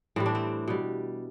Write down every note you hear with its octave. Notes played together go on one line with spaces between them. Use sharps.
A2 E3 G3 C4
D4
C4
B2 G3